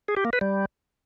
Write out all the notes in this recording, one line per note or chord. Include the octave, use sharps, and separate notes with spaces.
G#4
G4
A#3
B4
G3